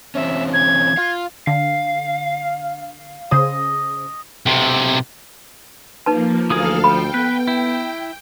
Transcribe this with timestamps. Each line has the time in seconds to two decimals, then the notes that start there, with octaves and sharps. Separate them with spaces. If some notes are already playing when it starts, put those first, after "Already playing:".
0.15 E3 C4 C#4 E5
0.53 G#6
0.97 F4 F5
1.47 D3 F5
3.31 C#3 G#4 C5 D#5
4.46 B1 C3
6.06 F3 A#3 D#4 B4 A5
6.50 D2 E3 A#3 G#4 A4 F5 D#6 F6
6.84 F3 G5 B5
7.14 B3 B4
7.48 E4